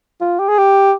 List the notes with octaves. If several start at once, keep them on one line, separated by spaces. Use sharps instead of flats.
F4
G4
G#4
G4